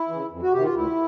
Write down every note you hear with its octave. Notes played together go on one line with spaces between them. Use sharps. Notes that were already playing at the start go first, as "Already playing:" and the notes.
Already playing: E4
C#3 E3
F2
F#4
C3 D#3 G4
F4
D2 E4